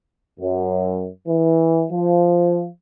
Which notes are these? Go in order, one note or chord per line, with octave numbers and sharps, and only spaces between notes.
F#2
E3
F3